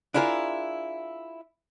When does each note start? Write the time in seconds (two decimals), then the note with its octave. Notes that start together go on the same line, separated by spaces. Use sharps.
0.14 D4 E4 F4 G#4 A#4